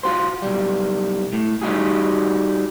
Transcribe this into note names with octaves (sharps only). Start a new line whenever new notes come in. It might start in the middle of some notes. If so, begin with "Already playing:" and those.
F4 F#4 C5
B1 G3
A2
G3 D#4 F#4 G#4